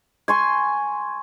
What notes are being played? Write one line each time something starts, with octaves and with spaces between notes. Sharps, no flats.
G#5 C6 C#6